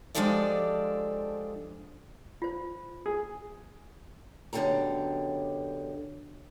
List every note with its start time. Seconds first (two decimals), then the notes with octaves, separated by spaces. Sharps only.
0.15 F3 G#3 D4 G4 A4 D5
2.42 F4 C5
3.06 G#4
4.53 F#2 B2 D3 G4 G5 A#5